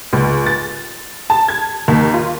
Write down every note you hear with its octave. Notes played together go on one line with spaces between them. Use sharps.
C#2
A6
A5
G#6
D#2
F4